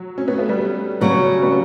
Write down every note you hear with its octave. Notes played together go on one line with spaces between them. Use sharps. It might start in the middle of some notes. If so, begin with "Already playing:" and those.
Already playing: F#3
C#4
B3
A3
G3 B3
C#3 F#3 G3 B3 C#4
G3 B3